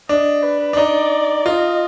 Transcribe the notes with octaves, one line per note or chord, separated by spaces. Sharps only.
D4 D#5
B4
D4
D#4 D5
F4 D#5